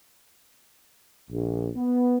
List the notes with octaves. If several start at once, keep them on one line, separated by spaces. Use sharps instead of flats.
A#1
B3